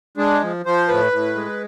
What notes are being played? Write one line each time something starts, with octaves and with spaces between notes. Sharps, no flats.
G#3 D4
F3
F3 C5
A2 B4
A2
G#3